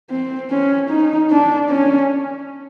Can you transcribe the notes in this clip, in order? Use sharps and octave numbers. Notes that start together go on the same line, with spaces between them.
C4
C#4
D#4
D4
C#4